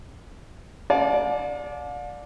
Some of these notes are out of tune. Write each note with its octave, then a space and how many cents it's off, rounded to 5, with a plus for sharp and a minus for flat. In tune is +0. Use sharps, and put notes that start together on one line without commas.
D5 +0 F5 +45 A5 -40